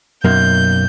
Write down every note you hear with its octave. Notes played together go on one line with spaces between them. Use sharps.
B1 F#2 A#3 G6